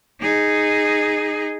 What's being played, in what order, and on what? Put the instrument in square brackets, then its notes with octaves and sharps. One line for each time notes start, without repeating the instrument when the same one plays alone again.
[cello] D#4 G#4